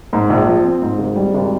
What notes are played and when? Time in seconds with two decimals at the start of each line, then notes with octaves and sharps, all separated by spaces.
0.13 G#2
0.30 A#1
0.47 F3
0.64 C4
0.82 G#2
0.99 G#1
1.16 G3
1.34 G#1